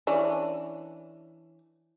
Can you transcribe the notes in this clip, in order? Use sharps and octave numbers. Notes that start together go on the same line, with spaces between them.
E3 C#4 D4